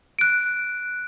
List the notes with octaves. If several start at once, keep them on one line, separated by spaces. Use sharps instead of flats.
F#6 D7